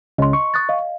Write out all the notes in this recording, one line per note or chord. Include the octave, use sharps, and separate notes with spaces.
C#2 C#3 C#4 D#5 C6
C#6
D#6 F#6 A6
D#5 F5